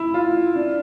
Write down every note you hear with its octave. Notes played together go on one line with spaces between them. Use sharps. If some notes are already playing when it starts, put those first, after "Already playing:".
Already playing: E4
F4
D4